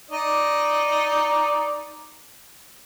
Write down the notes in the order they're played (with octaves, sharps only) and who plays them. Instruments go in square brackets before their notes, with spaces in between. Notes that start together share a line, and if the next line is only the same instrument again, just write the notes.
[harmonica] D#4 D5 D#5